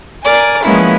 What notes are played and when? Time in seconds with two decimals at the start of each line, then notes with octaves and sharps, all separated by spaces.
0.22 A#4 D5 G#5
0.64 F3 G#3 A#3 B3 C#4 E4